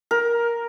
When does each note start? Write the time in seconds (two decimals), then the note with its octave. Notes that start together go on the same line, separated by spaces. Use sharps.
0.11 A#4